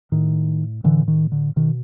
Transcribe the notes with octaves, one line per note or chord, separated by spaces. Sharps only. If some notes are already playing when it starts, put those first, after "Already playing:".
A2 D#3
A2 D3 E3
D#3
D3
B2 D#3